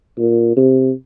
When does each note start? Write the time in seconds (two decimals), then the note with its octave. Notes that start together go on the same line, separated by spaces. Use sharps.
0.19 A#2
0.57 C3